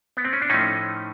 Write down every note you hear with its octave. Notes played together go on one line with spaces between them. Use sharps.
B3
C4
C#4
D4
A2 F3 A3 C#4 D#4